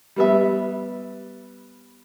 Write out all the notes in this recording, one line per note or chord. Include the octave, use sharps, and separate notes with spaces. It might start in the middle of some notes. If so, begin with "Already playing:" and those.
G3 B3 E5